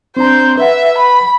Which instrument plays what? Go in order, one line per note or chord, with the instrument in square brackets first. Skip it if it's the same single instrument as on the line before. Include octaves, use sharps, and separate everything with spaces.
[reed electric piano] C4 D4 A#5 [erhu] C5
[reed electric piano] B4 F#5 [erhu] E5
[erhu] B5